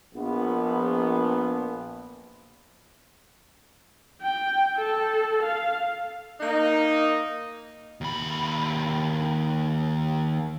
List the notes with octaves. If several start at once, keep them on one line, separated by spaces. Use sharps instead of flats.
A#1 B3
G5
A4
F5
A#3 D#4
D#2 B5